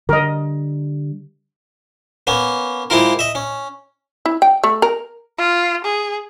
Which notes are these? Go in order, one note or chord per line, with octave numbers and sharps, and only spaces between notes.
D3 G3 A#4 D#5
A#3 B3 C#4
G#3 A#3 C4 E4 F4 A#4
D#5 E5
C#4
E4
G5
A3
A#4
F4
G#4